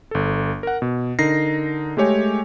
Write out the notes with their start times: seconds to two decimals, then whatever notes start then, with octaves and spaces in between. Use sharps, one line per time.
0.11 G1 A4
0.63 A#4 F#5
0.82 B2
1.19 D3 D#4 A#4 A#6 C7
1.97 G#3 A3 G4 C#5 G#5